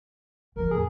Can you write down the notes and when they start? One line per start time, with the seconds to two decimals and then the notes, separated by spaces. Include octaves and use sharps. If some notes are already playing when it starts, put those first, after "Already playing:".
0.56 E3 F3 A#4
0.71 F2 A2 G#4